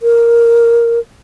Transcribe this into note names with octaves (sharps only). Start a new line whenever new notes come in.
A#4